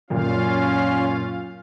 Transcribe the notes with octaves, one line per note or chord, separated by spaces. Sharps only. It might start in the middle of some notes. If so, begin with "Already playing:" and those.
F#2 A#2 C#4 F4 F5